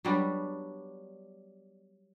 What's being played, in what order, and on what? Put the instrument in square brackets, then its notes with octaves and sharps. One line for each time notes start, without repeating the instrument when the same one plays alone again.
[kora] F#3 G3 B3 D4